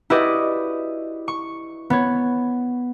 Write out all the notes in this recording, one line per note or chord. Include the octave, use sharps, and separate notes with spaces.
E4 F#4 G4 B4 D5 D#5
C#6
B3 C#5